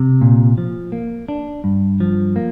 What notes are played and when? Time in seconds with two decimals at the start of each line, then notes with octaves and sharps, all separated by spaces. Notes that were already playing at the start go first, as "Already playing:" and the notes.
Already playing: C3
0.21 A#2
0.58 F3
0.92 A#3
1.28 D4
1.64 G2
2.00 F3
2.36 A#3